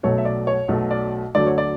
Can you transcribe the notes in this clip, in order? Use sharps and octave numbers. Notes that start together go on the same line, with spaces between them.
B1 B2 F#3 A3 C#5
E5
D5
C#5
B1 B2 F#3 A3
D5
D2 D3 F#3 A3 D5
C#5
D5